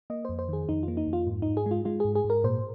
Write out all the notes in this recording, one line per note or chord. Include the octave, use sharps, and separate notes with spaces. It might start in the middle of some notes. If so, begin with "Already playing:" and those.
A#3 D#5
F2 C5
C5
D#3 G#4
F2 D#4
F4
A#3
D#4
F2
F4
G#2
G#2 D#4
G#4
G#3
F4
G#3 F4
G#2 G#4
G#4
G#2
A#4
A#2 C5